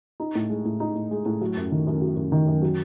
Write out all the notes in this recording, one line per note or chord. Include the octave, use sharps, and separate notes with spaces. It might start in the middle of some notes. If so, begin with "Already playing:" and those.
D#4
A2
G#3
A2
D#4
A2
G#3
A2
F#3
F#2
D#3
F#2
F#3
F#2
D#3
F#2
F#3